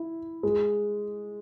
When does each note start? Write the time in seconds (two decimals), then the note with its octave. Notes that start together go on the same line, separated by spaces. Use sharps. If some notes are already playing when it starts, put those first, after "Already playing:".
Already playing: E4
0.43 G#3